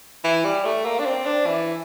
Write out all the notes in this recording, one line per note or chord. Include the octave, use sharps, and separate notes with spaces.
E3
G3
A3
A#3
D4
C4
D4
E3